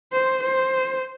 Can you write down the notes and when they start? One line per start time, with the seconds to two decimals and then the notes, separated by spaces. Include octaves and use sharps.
0.12 C5
0.43 C5